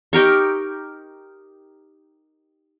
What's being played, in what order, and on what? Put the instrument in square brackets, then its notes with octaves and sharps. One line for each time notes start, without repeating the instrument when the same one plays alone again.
[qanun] D#4 G4 A#4 C#6